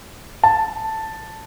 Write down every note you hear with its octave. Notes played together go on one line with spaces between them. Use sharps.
A5